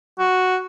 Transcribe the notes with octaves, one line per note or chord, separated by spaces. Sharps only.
F#4